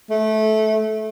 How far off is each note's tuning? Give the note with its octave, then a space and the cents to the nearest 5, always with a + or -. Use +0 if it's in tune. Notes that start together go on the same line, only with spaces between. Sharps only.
A3 -20